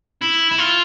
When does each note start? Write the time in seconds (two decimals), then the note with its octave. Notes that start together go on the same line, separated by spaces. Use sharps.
0.22 E4
0.51 E4
0.58 F4